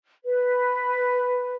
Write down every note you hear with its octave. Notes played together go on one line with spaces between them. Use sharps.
B4